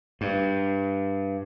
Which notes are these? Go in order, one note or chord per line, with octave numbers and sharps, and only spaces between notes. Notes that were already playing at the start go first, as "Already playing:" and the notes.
G2